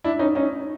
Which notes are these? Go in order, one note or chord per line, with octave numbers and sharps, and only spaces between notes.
D4 E4
C#4 D#4
C#4 D#4